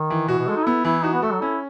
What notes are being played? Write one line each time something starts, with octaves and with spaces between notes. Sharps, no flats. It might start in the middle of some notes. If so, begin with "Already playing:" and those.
Already playing: D#3
E3
B2 F#4
B2
G#3 A4
D#4
B3 E4
E3 E4
D#4 F#4
B3
A3 A4
F#3
C#4 E4